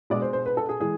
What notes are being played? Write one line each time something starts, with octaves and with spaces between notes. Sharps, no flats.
B2 G#3 D5
C5
C5
B4
A4
G#4
E3 G#3 G#4